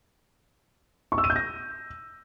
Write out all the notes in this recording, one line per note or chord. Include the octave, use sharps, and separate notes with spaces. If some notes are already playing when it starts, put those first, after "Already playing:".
C#6
E6
D#7
G6
A#6